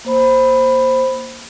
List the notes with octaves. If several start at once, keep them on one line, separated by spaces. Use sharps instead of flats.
A#3 C5 B5